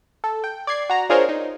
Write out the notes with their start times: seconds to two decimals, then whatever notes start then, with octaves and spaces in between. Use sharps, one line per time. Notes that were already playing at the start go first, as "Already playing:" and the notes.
0.24 A4
0.44 G5
0.67 D5 G#6 C7
0.90 F#4 A#5
1.09 D4 F4 G#4 A#4 C5 C#5
1.29 D#4